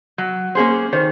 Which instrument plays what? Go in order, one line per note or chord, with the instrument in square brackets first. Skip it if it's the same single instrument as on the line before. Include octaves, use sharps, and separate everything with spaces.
[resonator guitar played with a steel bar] F#3
A#3 C#4 G#4 C5
[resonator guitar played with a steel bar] D#3 [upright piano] C5